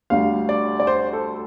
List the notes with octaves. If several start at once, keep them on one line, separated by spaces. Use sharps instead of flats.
D2 D3 G3 F5
D5
D5
C5
A4